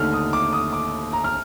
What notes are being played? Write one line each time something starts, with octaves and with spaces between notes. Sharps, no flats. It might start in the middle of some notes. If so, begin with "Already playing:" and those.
Already playing: D#2 D3 A3 D#4 F6
D#6
D6
D#6
D6
A#5
F6